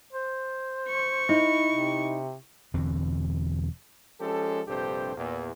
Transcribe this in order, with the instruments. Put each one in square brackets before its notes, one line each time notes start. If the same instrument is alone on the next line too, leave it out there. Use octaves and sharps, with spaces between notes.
[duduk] C5
[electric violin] C#6
[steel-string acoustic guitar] D#4 [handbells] E4
[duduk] C3
[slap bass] E1 E2 D3 C4
[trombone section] F3 G#3 C#4 G4 A4
A#1 G2 C3 G4 A4 C5
E2 A#2